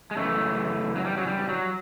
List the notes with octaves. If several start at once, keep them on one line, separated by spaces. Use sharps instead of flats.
G#3
F#2 C#3 E3 A3
F#3
G3
F#3
G3
F#3